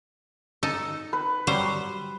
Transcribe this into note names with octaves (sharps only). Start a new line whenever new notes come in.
D#4 A4
B4
F#3 G3 C5